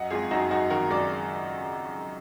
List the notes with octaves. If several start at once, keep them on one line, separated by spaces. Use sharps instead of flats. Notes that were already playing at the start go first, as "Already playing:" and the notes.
Already playing: F#2 D#5 F#5
G#1 F4 G#4
F#2 D#4 F#4
F#2 D#4 F#4
D#3 F#4 A#4
F#2 A#4 D5